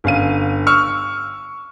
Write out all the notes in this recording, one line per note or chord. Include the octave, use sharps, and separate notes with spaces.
G1 C#4 F5 D#7
C#6 E6 F6